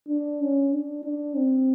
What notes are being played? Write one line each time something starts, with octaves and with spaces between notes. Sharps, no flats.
D4
C#4
D4
D4
C4